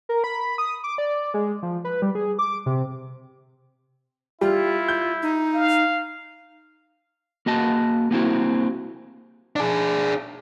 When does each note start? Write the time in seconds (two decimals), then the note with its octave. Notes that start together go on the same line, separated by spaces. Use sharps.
0.09 A#4
0.24 B5
0.58 D#6
0.84 D6
0.98 D5
1.34 G#3
1.63 F3
1.85 B4
2.02 G3
2.15 G#4
2.39 D6
2.66 C3
4.41 G3 E4 F4
4.88 G6
5.23 D#4
5.54 F5
7.46 A#3 F#4 D#5 A5
8.11 A#3 C4 E4 F#4
9.56 D4 G#4